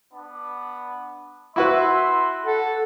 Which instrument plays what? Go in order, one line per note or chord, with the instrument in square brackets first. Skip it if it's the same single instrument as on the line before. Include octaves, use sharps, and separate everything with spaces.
[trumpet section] B3 D4
[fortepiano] E4 F#4 B4 [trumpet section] E5 C6
[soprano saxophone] A4 [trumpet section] F#5